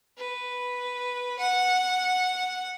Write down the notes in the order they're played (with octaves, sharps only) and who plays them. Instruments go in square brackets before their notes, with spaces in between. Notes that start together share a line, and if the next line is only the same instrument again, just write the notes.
[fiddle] B4
F#5